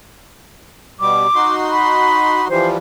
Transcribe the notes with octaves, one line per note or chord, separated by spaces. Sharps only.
B2 G3 D6
D#4 F#4 C6
B5
E3 F3 G3 C5